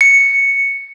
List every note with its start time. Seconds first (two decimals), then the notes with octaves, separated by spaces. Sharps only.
0.01 C#7